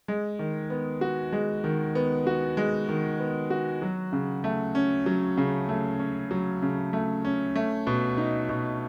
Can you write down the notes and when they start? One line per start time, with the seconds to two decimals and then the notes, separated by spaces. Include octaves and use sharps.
0.08 G#3
0.39 D#3
0.70 B3
1.01 F#4
1.32 G#3
1.64 D#3
1.95 B3
2.27 F#4
2.57 G#3
2.89 D#3
3.19 B3
3.50 F#4
3.82 F#3
4.13 C#3
4.44 A3
4.75 C#4
5.06 F#3
5.38 C#3
5.69 A3
6.00 C#4
6.31 F#3
6.62 C#3
6.93 A3
7.25 C#4
7.56 A3
7.87 B2
8.17 D#4
8.49 B2